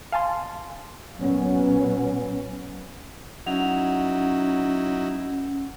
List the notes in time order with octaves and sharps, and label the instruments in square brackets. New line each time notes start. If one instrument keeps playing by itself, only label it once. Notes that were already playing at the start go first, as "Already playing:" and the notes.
[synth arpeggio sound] F5 G#5 A5 C6
[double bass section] B1 A#2 F#3 B3 C#4
[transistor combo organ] F#3 D#4 E4 [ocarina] C#4 [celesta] F#5 F7